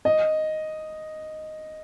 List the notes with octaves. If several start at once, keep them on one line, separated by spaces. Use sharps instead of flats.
D#5